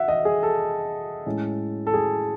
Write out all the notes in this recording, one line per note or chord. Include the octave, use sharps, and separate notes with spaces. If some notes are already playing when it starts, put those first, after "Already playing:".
Already playing: E5 F#5
D#5
G#4
A4
A2 G#3 C#4
A4
G#4